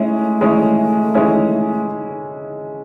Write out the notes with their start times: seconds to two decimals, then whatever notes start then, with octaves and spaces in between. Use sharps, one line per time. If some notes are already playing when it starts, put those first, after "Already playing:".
Already playing: G#3 A3 C#4 E4
0.41 G#3 C#4 E4
1.14 G#3 C#4 E4